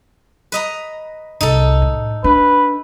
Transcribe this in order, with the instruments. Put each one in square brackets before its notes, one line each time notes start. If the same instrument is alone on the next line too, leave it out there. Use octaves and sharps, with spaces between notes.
[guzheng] B4 D#5 A#5
[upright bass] C2 [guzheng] D#4 A4
[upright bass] A2
[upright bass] D4 [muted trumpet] B4